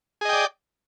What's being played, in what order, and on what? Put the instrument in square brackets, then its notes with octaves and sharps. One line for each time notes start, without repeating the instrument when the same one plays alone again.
[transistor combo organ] G#4
D#5
G5
D5